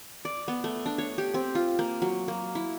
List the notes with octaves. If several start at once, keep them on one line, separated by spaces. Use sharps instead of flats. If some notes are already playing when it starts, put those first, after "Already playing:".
D5
B3
A3
D4
C#5
G4
C4
F4
A#3
F#3
A#3
E4